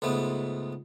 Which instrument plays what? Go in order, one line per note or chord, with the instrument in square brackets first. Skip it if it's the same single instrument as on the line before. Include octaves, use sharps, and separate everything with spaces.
[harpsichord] C#2 G#2 A3 B3